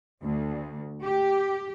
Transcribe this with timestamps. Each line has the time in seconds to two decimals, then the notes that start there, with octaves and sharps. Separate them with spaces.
0.23 D2
1.04 G4